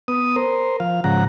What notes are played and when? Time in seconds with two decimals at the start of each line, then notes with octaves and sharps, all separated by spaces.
0.08 B3 D#6
0.36 A#4 C5
0.80 F3 F5
1.04 G#2 C#3 F3 F#5 A#5